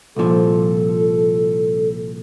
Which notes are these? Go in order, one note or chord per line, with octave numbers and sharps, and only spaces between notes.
C2 A#2 F3 A4